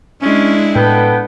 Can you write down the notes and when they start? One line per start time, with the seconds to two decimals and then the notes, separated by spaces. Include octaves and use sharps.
0.22 G#3 C#4 D4 E4
0.76 A2 B3 A4 B4 G5